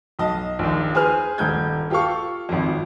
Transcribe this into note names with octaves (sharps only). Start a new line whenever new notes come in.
B1 D#5 A5
A#1 D#2
G#4 B4 C5 G#5 F6
D#1 G2 G6 G#6
F4 G4 A4 F5 C#6
G#1 F2